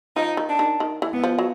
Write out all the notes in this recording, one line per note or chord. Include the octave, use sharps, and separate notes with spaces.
F3 D#4
D#3
D4
D#3
D#3
E3
B3
F3
F#3